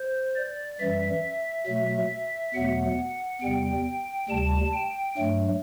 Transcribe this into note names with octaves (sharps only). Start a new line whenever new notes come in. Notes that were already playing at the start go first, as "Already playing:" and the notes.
Already playing: C5
D5
F#2 E3 G3 E5
B2 F#3 A3
E2 B2 F#3 A3 F#5
E2 C3 G3 G5
D2 C3 G3 A5
G5
G2 F#3 A3